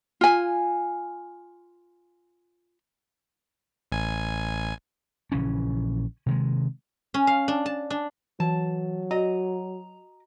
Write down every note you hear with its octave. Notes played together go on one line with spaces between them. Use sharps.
F4 G#5
A1 G#5
A#1 C#3 E3 C#4
C3 D#3 G#3
C#4
F5
D4
A5
D4
E3 F#3 A5
F#4 D#5 A#5